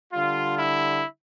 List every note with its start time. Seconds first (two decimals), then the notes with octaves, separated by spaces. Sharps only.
0.12 D3 G3 F4
0.58 E4